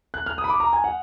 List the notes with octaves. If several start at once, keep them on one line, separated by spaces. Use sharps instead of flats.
F#6
F6
D#6
B5
D6
A#5
G#5
F#5